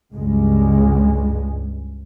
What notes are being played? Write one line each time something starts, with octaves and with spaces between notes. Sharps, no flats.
C#2 G2 G#3